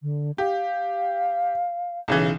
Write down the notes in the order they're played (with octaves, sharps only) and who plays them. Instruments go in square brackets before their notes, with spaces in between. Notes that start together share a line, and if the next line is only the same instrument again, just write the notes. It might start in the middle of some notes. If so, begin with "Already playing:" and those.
[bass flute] D3
[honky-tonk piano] G4 [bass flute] F5
[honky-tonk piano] B1 C#3 E3